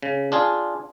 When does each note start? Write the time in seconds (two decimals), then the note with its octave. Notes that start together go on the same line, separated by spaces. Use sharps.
0.03 C#3
0.32 D4 F4 G#4